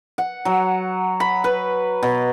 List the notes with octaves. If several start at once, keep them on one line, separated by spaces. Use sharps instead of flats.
F#5
F#3
B5
B4
B2